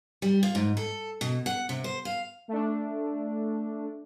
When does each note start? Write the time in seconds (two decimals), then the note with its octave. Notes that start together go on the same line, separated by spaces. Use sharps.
0.22 G3
0.43 F4
0.55 G#2
0.77 A4
1.21 B2
1.46 F#5
1.69 C3
1.84 C5
2.05 F5
2.48 A3 D4